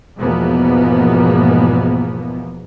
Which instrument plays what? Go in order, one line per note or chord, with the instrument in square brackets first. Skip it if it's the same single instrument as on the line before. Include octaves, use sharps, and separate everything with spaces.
[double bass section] E2 G#2 B2 F3 A#3 B3